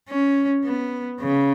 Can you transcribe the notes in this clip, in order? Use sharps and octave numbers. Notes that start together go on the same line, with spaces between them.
C#4
B3
C#3